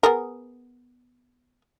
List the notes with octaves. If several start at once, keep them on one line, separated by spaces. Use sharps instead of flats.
B3 G#4 A#4